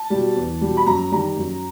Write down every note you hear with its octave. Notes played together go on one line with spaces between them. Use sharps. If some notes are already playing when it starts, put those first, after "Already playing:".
Already playing: A5
B2 G3
E2
B2 G3
B5
F#2 A#5
D#3 G3 A#5
F#2